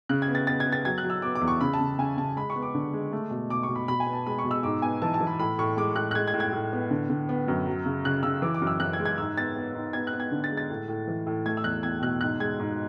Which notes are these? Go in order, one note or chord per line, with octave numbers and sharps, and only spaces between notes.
C#3 F#6
G#6
B3
A6
B3 A6
G#6
B3
A6
F#3 G#6
F#6
F#3
E6
B3 D6
D6
E2
C#6
C#3 B5
A5
C#3
C#3 G#5
C#3 A5
G#3 B5
C#6
B3
D6
D3
G#3
A3
B2
B2 D6
C#6
B2
B5
B2 B5
G#5
B3
A5
G#3 B5
C#6
B2
E6
G#2 D6
B3 G#5
E3 A5
A5
E3
B5
A2 B5
A2 C#6
G#3 D6
A2 F#6
F#6
G#3 G#6
G#6
A2
G#6
A2
B3
D3
D3
B3
F#2
F#3
C#3
C#3 F#6
C#3 E6
E3 D6
D6
F#2
E6
F#2 F#6
G#6
G#3
G#6
G#2 E6
B3 A6
B3
G#2
B3 G#6
F#6
B3
G#6
D3
A6
G#3
A6
A2
A2
E3
A2
A3 G#6
E6
E2 F#6
E2 G#6
B2 F#6
G#2 F#6
G#3 G#6
G#2